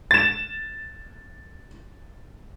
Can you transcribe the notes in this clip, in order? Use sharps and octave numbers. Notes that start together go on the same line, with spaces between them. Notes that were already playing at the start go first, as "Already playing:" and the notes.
A6 E7